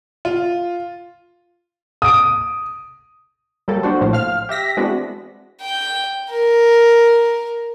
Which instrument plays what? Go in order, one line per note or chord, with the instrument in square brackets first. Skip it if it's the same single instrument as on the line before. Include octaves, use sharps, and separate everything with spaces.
[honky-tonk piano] F4
[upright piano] D#6 D7
[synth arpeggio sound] F#3 G3 A#3 A4
A#3 D4 F#4 C5
A#1 A2 F3 C5
F5 F6
G4 E5 A#6 B6
E3 G#3 B3 C4 D4 F#4
[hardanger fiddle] G5
A#4